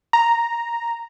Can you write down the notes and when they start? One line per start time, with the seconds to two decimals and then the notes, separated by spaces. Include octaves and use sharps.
0.13 A#5